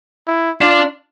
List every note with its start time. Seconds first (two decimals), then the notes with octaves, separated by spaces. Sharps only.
0.27 E4
0.61 D4 F4